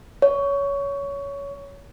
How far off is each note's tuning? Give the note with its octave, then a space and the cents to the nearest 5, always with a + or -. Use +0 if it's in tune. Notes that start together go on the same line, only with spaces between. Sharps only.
C#5 +20